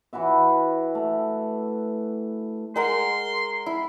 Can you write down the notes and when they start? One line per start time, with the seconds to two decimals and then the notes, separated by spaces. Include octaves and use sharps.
0.13 E3 E4 F#4 E5
0.95 A3
2.76 G#3 A#4 F#5 C6
3.66 E4